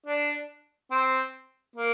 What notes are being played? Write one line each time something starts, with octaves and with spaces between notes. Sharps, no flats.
D4
C4
A#3